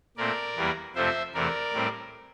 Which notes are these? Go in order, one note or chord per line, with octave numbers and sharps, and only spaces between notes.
A#2 A3 C4 A#4 D5
E2 E3 G3 A#3
F2 C3 F3 A3 C4 C5 E5
E2 C3 E3 A3 A#4 D5
A2 G3 C4